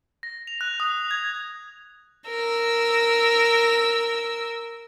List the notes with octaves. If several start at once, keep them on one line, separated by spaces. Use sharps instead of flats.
A#6
F7
F#6
D#6
G#6
A#4 E6